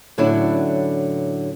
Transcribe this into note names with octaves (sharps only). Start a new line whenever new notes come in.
A2 D3 F#3 C#4 D4 E4